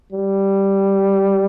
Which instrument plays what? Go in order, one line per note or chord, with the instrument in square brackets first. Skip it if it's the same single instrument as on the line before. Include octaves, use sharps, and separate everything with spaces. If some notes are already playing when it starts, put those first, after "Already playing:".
[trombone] G3